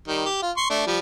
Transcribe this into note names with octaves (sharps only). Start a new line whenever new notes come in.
D#3 G3
G4
F4
C6 C#6
A3 D4
F3 G3